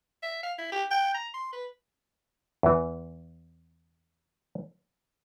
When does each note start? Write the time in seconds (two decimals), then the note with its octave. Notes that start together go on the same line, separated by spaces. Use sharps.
0.23 E5
0.43 F5
0.58 E4
0.72 G4
0.91 G5
1.14 A#5
1.34 C6
1.52 B4
2.63 E2 E3